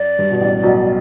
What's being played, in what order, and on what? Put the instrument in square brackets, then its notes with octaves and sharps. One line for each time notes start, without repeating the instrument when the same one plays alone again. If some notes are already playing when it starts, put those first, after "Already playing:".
Already playing: [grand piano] F#2 [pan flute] D5
[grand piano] G2
B2
A1 A2
B1 B2